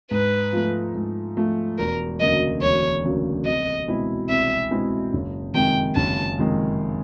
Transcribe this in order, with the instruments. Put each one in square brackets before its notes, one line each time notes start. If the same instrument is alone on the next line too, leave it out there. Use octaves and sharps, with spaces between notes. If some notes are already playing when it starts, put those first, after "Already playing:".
[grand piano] G#2 [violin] B4
[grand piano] F3 A3
G#2
F3 A3
[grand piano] E1 [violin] A#4
[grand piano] D2 C#3 F#3 A#3 [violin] D#5
[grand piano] E1 [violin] C#5
[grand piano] D2 C#3 F#3 A#3
[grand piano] C2 [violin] D#5
[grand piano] B2 G#3 C4 E4
[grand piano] C2 [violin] E5
[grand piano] B2 G#3 C4 E4
F#1
[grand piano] F2 C3 D#3 G#3 [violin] G5
[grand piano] F#1 [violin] A5
[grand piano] F2 C3 D#3 G#3